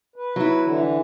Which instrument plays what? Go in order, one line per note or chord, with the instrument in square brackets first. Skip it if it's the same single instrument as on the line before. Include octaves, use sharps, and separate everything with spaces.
[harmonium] B4
[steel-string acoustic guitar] F#3 E4
[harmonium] D3 E3